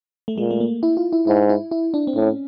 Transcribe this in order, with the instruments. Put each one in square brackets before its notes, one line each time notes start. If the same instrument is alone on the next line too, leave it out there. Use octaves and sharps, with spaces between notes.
[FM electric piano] A3
[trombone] A#2 [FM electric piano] G#3
[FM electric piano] A3
A#3
E4
F4
E4
[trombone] G#2 [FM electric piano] E4
[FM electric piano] E4
E4
D4
C4
[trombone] A2 [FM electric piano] C#4